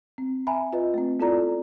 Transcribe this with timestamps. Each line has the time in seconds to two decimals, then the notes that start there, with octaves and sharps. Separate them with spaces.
0.18 C4
0.47 E5 G#5 A#5 B5
0.73 F4 B4 D#5
0.94 A3 C4
1.20 B3 E4 F4 A4 D5 A#5